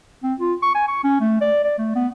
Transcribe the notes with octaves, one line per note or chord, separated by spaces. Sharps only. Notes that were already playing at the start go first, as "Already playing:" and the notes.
C4
F4
C#6
G#5
C#6
C#4
A3
D5
D5
A3
B3